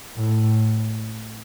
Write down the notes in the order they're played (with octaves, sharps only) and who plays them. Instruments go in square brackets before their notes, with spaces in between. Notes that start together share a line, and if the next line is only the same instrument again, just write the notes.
[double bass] A2